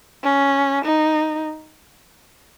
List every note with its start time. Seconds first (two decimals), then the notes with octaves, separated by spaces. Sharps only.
0.23 C#4
0.85 D#4